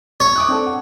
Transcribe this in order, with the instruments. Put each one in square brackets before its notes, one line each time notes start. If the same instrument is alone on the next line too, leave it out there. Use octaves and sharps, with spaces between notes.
[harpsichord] C#5
[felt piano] D6 D#6 F#6
C4 D4 A4
F#5